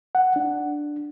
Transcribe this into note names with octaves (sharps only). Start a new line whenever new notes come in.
F#5
D4